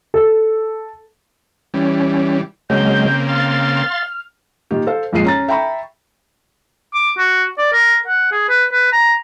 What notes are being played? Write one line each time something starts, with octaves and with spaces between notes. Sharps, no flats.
A4
E3 G3 C#4
C#3 F#3 G#3 A#3 C4 G6
F5 C6 F6 A6
A#2 D#3 G4
A4 C5 F5
F2 A#2 F3 G#3 C7 D#7
C#4 A#5 A6
E5 G5 A#5 B5 C#6
D6
F#4
D5
A#4
F#5
G#4
B4
B4
A#5